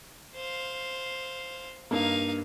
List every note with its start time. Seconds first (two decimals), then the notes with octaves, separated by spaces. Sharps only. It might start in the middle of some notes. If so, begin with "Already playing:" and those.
0.35 C5 F5
1.91 G2 A#3 D#4 F5